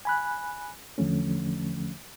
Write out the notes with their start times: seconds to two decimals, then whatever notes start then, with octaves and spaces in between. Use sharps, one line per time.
0.05 G#5 B5 F#6
0.98 E2 D3 F3 A3 C#4